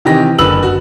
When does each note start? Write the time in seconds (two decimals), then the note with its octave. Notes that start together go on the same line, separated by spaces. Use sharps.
0.05 C3 D#3 E3 G4 D#5 A#6
0.38 F#1 D3 B4 E6 F#7
0.63 F#4